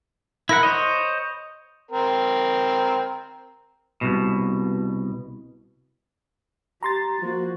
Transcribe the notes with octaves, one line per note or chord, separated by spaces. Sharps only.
E4 A#4 F#5 B5
C5 C#5 D#5
C4 A#4
C2 B2
G4 A#5 C6 A6
F3 A#3 F#4